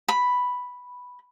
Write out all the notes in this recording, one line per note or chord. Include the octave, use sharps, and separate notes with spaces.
B5